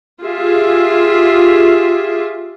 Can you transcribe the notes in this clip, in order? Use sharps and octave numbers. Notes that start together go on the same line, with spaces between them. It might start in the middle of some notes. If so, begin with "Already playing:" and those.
F4 G4 G#4 E5